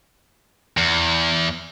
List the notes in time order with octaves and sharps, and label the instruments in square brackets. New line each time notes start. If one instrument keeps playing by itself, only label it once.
[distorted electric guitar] E2